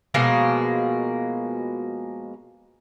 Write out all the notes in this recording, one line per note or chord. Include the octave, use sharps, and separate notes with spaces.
B2 F3 G#3 A#3